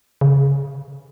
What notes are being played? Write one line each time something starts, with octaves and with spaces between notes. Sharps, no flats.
C#3